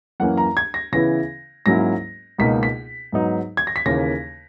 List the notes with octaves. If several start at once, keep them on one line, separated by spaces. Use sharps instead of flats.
F#2 E3 A#3 C#4 F#5
A#5
G#6
A#6
C#3 E3 B3 E4 A#6
G#2 F#3 A#3 C#4 E4 A#6
C#2 B2 A#3 D#4 B6
B6
G#2 F#3 B3 D#4
G#6
A#6
B6
D#2 C#3 E3 A#3 A#6